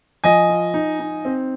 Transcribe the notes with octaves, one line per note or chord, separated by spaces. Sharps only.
F3 D#5 G#5
F4
D#4
D#4
C4